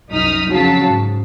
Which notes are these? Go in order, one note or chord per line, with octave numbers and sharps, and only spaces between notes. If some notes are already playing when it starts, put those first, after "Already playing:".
C2 F#2 D#4 D#6 F6 B6
F2 C#3 F#3 F5 A5 B6
G#2